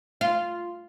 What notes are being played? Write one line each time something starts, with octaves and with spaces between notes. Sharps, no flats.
F4